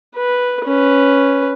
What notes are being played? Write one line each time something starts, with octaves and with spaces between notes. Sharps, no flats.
B4
C#4 B4